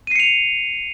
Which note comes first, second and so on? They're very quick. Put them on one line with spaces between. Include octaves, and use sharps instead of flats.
D#7 C7 C#7 F7